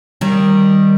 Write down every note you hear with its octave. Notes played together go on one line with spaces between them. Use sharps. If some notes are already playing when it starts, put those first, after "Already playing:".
D#3 G3